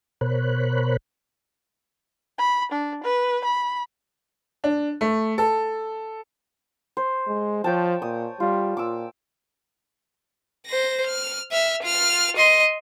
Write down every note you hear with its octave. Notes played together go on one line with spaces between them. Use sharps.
B2 A#4 C5 C#5 B5 F#6
B5
D4
B4
B5
D4
A3
A4
C5
G#3
F3 C#5 G5 A5
A#2 D#6
G3 F4
A#2 D6 E6
C5 A#6
F6
E5 F6
F4 F6
D#5 C6